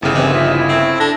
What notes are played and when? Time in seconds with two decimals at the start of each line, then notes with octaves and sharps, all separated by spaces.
0.02 G1 A2 C#3
0.14 D#2 C3 E3
0.33 F3 E5
0.52 E4
0.69 A3 C4
1.00 D4 A4 A#6